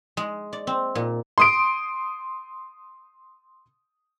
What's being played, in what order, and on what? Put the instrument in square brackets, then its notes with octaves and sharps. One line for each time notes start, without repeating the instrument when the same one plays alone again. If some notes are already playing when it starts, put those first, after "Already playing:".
[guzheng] G#3
D5
C4
A#2
[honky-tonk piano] C6 D#6 D7